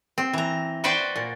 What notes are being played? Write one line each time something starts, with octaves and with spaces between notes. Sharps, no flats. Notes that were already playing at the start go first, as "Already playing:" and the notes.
C4
E3 A#5
F#4 B4 C5 D5 G5
A#2